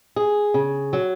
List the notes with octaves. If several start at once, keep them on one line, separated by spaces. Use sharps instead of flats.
G#4
C#3
F#3